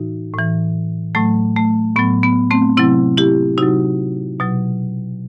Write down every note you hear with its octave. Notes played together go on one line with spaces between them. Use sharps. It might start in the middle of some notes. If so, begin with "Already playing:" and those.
Already playing: A2 E3 D#4 F#4
A2 E3
A2 F#3 A3
A3
A2 F#3 B3
B3
A3 C4
C3 F#3 C4 E4
E4 G4
C3 F#3 D#4 F#4
B2 F#3